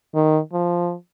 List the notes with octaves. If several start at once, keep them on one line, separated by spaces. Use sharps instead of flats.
D#3
F3